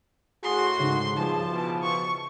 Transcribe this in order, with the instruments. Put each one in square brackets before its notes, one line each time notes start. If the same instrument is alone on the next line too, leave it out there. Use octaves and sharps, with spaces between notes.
[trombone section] A2 F#4 [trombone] G#4 [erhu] C6
[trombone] G#2 [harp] C#3 D#4
[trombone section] G2 B2 G#4 [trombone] F3 [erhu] A5
[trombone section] B2 E3
[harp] A5 [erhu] C#6